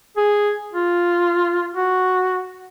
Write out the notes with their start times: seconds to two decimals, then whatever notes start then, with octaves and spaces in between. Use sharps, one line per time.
0.17 G#4
0.73 F4
1.73 F#4